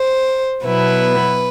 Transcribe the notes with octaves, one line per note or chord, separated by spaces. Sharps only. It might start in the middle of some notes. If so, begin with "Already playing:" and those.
Already playing: C5
B2 F#3 B3 E4 B4